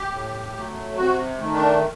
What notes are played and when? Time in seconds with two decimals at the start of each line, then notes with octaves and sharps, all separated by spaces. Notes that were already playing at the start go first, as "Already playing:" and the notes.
Already playing: G4
0.11 A2
0.53 F#3 A3
0.96 C3 F#4
1.40 D#3 A3
1.54 D4